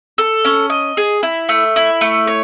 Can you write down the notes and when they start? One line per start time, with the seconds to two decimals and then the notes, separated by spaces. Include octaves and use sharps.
0.18 A4
0.45 C#4
0.70 D#5
0.97 G#4
1.23 E4
1.49 A3
1.76 E4
2.01 A3
2.27 C#5